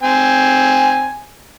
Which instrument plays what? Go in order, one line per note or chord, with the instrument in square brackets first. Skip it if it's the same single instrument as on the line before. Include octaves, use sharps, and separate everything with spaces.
[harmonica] C4 G#5